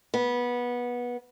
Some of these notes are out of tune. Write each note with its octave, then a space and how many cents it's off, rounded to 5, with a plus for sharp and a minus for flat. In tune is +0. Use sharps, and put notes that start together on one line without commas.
B3 -20